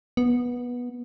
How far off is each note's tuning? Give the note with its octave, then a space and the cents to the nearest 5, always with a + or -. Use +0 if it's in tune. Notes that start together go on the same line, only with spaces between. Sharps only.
B3 -15